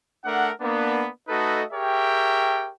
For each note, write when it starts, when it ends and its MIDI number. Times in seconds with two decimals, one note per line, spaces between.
0.25 0.50 57
0.25 0.50 62
0.25 0.50 70
0.25 0.50 78
0.61 1.07 58
0.61 1.07 59
0.61 1.07 62
1.29 1.62 57
1.29 1.62 63
1.29 1.62 66
1.29 1.62 69
1.29 1.62 71
1.29 1.62 75
1.72 2.70 67
1.72 2.70 68
1.72 2.70 70
1.72 2.70 73
1.72 2.70 76
1.72 2.70 79